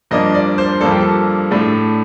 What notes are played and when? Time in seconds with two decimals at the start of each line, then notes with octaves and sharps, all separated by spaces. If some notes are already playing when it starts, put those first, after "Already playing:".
0.11 G2 F3 A#3 D4 D#5
0.35 D5
0.58 C5
0.81 G2 F3 A#3 D4 A4
0.91 G4
1.01 A4
1.51 A2 A3 D4